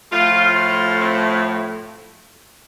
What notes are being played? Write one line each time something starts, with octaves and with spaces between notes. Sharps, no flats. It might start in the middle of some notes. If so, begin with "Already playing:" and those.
A2 F3 A3 F4
F4
C4